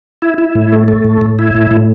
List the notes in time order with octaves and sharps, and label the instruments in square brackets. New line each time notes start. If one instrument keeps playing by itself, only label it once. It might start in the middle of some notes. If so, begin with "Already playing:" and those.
[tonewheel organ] E4
E4
A2
A3
A3
A2
A2
E4
A2
A2